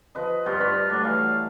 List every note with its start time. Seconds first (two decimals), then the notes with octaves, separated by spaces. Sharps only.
0.15 F3 B4 D#5
0.46 G2 F4 F#4 C5
0.59 D4 B5
0.89 F#3 A3 D4
1.05 E3 F5